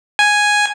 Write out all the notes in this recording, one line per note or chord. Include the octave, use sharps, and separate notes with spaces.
G#5